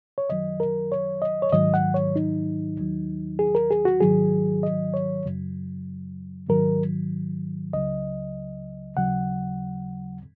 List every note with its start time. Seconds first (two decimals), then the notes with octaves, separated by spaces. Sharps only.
0.18 C#5
0.29 F#2 D#3 F#3 D#5
0.60 A#4
0.92 C#5
1.22 D#5
1.42 C#5
1.52 G#2 D#3 F#3 D#5
1.74 F#5
1.94 C#5
2.16 D#4
2.77 D#2 D#3 F#3
3.39 G#4
3.55 A#4
3.71 G#4
3.85 F#4
4.00 G#2 D#3 F#3 G#4
4.63 D#5
4.94 C#5
5.26 F#2 C#3 F#3
6.49 G#2 D#3 F#3 A#4
7.73 C#2 C#3 F#3 D#5
8.97 D#2 C#3 F#3 F#5